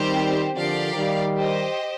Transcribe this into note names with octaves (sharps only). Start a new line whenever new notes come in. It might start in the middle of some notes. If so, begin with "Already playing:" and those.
Already playing: D#3 G3 C4 G4 C5
D3 F3 G4 A#4 D5 F5
D#3 G3
G4 C5 D#5